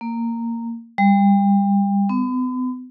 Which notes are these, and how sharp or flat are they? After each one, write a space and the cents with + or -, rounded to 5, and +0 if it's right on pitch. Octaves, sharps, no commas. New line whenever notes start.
A#3 -10
G3 +30
B3 +40